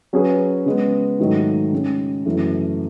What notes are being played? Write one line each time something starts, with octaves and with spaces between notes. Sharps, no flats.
F#3 C#4 G#4 B4
C#3 G#3 B3
G#2 D#3 F#3 A3 D#4
C#3 G#3 C#4
F#2 C#3 E3 A3